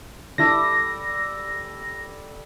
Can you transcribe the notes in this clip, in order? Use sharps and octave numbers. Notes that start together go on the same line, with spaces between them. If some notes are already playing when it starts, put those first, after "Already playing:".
D3 G3 E4 A4 D6 A#6